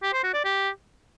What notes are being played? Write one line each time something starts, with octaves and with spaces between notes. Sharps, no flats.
G4
C5
F#4
D5
G4